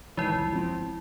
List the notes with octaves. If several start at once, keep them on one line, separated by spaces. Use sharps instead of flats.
A1 D#3 E3 G#3 E4
C2 F2
G1 F3 C4